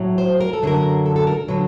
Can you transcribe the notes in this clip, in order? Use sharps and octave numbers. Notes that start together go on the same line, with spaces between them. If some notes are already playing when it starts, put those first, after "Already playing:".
Already playing: A2 F#3
C5
A#4
A4
F#2 D3 F#3 A#4
A4
A4
A#4
D3 F#3 B4